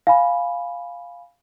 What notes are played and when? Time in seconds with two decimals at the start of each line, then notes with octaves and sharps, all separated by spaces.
0.07 F5 G#5 B5